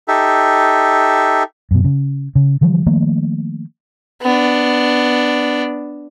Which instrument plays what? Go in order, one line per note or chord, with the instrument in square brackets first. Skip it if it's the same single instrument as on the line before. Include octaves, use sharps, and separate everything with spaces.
[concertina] D#4 G4 A4 E5
[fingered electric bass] F#2 B2
C#3
C#3
D3 E3 F3 G3
D#3 F3 A3 A#3
[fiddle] B3 D4